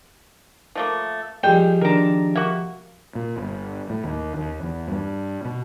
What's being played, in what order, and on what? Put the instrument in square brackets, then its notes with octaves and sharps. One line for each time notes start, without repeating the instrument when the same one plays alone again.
[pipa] F3 A3 A#3
[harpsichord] F2 G3 G#3 [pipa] G5
[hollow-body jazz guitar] D#3 D4 [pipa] A#4 A#5
[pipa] A#3 F#4 [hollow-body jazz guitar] E5
[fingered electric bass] A#2
G1
A2
D#2
D#2
E2
G2
B2